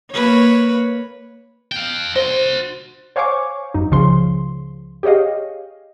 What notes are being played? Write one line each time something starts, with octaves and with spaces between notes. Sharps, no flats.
A#3 B4 C#5
F5 G5
F#4 C5 C6
C5 C#5 F5 G#5 C#6 D6
F#2 D#4
C#2 C#3 F3 C6
G4 G#4 C#5 D#5 F5